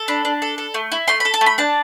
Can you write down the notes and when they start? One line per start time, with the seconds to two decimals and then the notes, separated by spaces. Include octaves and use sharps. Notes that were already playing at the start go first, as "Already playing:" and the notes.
Already playing: A4
0.08 D4 B5
0.25 D4
0.42 A4
0.58 A4
0.74 A3
0.92 E4
1.08 A3 C6
1.20 A4 B5
1.34 A5
1.41 A3
1.46 B5
1.58 D4 A5